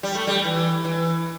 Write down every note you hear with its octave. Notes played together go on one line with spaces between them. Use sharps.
G3
A3
G3
E3
E3